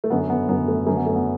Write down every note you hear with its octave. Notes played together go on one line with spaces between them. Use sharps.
A3
F#2 D3 B3
B3
F#2 D3 B3
A3
F#2 D3 A3
B3
A3
B3